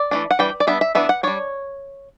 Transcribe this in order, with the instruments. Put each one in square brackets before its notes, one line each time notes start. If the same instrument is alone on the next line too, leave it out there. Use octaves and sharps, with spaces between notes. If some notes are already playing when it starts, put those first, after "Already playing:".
Already playing: [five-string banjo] D5
E3 A3 D4
F#5
E3 G3 D4 G5
D5
G3 B3 D4 E5
E5
E3 B3 D4 E5
F#5
G3 D4 C#5